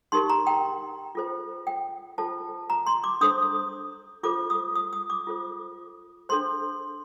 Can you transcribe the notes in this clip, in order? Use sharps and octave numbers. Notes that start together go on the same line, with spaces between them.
D#4 G4 A#4 C6
A#5
G5
F4 A4 C5
G5
F4 A4 C5 A5
A#5
C6
D6
D4 A4 C5 D#6
F4 A4 C5 D6
D#6
D#6
D#6
D6
F4 A4 C5
D4 A4 C5 C6